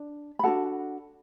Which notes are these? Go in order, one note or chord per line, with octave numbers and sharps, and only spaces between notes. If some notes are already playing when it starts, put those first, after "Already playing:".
Already playing: D4
B5
D4 F#4 A4 F#5 A5